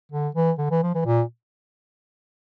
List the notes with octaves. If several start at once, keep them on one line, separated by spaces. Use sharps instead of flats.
D3
E3
D3
E3
F3
E3
A#2